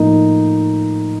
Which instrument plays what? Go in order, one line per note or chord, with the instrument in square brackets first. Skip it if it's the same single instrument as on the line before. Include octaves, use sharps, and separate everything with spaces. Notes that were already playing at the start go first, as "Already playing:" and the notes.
Already playing: [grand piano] A2 F3 A#3 D#4